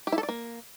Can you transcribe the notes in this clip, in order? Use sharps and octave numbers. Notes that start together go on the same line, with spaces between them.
G4
E4
A4
D5
A#3